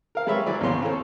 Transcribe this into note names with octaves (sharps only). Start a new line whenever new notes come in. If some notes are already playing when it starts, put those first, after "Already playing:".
A#4 F5
G3 G#3 A#4 B4 C#5 E5
E3 F#3 D5
A1 D#2 C#3 B3 C6
C4 G#4 A4 C#5